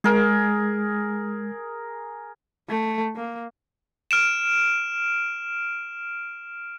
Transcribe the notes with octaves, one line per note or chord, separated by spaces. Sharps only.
G#3 G#4 A#4
A3
A#3
F6 D7 E7